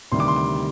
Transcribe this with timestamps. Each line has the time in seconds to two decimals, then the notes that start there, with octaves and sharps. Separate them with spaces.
0.12 D2 C3 D#3 G3 C6
0.20 D6
0.28 C6
0.36 D6